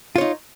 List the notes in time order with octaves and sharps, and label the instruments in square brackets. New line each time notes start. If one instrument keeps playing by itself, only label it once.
[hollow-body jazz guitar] F4
C#5
D#4